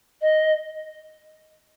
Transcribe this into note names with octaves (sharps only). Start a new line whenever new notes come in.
D#5